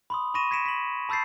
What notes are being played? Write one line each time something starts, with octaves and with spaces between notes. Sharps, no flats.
B5 C6 D#6
B5 C#6 A#6 D#7 E7
G#6 A#6 B6 C#7 D7 E7
B6 F#7
A5 B5 E6 G6 A6 C7